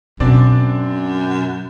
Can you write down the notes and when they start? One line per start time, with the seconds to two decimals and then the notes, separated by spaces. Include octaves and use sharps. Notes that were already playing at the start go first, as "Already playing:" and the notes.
0.20 F#2 B2 C4 D4 D5